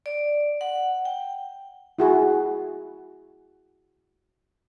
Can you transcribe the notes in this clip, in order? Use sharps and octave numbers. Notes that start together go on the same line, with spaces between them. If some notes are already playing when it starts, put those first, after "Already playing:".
D5
F#5
G5
E4 F#4 G#4